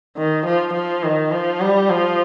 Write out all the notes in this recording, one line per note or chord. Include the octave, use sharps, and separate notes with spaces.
D#3
F3
F3
D#3
F3
G3
F3